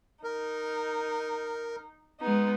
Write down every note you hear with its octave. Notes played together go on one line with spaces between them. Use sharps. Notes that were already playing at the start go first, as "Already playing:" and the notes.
D#4 A#4
G#3 B3 D#4